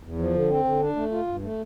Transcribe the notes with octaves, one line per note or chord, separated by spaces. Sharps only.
E2
F3
D3
C4
D3
D4
A3
F4
G2
A3